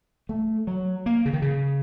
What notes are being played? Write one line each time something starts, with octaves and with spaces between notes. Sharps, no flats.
A3
F#3
A#3
C#3
D#3
C#3